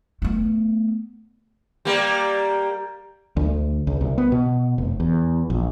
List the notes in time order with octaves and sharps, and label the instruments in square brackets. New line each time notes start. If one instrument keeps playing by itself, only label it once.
[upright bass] A3 B3
[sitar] G3 A#3
[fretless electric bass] D2
C#2
C2
B3
B2
F1
E2
A#1